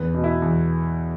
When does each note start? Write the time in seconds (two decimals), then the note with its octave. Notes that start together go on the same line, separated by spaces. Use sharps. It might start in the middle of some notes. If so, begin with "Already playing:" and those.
Already playing: E2 B4
0.14 B2
0.24 E4
0.42 E2